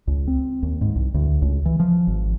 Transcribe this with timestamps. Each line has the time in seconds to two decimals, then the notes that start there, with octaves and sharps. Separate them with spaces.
0.07 C#2
0.27 C4
0.63 D#2
0.81 G#2
0.96 C2
1.14 D2
1.42 C#2
1.65 E3
1.80 F3
2.07 G#1